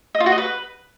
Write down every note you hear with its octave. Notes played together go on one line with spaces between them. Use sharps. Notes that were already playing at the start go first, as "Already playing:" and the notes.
D#5
F4
F#4
D#5
B4